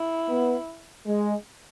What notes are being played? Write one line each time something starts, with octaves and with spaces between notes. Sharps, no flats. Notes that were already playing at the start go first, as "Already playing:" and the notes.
Already playing: E4
B3
G#3